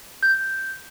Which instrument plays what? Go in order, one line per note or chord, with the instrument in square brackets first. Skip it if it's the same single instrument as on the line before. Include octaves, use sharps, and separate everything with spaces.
[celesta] G6